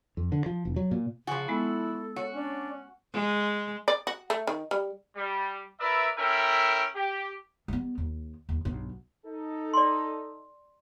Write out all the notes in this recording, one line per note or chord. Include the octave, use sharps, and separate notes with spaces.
F2
D3
F3
E1
F#3
A#2
C#3 F3 F#4 G#5
G#3 B3 E4 A4
F#4 C#5
C#4 D4
G#3
D5
F#4
A3
D#3
G3
G3
E4 A#4 B4 D5 E5
C#4 E4 A4 A#4 E5 G5
G4
G3 B3
D#2
D#2
B1 G2
D#4 A4
D5 C6